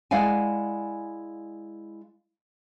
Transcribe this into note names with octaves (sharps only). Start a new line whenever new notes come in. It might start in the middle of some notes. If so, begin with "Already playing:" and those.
G#3 E4 D5 F5 F#5 G#5